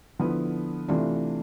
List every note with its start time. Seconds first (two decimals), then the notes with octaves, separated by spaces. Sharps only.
0.19 D3 F3 B3 E4 B4
0.88 C3 E3 A3 D4 F4